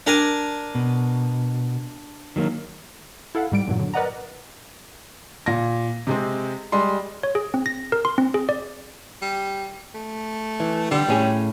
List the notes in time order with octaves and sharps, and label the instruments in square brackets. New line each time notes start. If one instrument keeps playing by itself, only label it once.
[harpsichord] D4 A#4 G#5
[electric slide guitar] B2
D#3 F#3 A#3
[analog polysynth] E4 A4 F5 F#5
G#2 G3 D7
E2 G2 A#2 F#3
D3 F#3
A#4 B4 D5 D#5 F#5 A#5
[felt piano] A#2 A#6
C3 G#3 C4
G3 G#3 C6
[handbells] C#5
G#4
C4
A#6
A#4
C6
C4
G#4
D5
[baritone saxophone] G3
A3
[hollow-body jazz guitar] E3
[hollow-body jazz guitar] D3 [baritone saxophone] G3
[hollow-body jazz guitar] A2 C#4 G#4